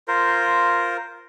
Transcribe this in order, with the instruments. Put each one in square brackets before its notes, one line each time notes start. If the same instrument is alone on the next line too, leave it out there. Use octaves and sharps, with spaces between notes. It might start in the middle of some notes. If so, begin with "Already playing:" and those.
[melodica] F4 A#4 C5